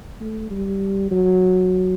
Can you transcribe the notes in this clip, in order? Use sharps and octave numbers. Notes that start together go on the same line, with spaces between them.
A3
G3
F#3